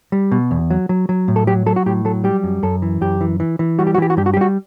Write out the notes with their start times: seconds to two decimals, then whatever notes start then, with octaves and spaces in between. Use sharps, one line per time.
0.12 G3
0.32 B2
0.51 E2
0.70 F#3
0.89 F#3
1.09 F#3
1.28 A2
1.36 A4
1.47 F#3 G4
1.66 F#3 A4
1.76 F#4
1.86 A2 G4
2.05 F#3 A4
2.24 G3 G4
2.44 F#2
2.63 F#2 A4
2.82 E3
3.01 F#2 G4
3.21 E3
3.40 E3
3.59 E3
3.79 G3 F#4
3.87 G4
3.94 F#4
3.98 E3 G4
4.10 F#4
4.17 G2 G4
4.26 F#4
4.34 G4
4.37 G3 F#4